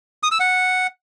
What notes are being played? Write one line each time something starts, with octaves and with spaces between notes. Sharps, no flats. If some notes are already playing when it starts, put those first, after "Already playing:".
D#6
E6
F#5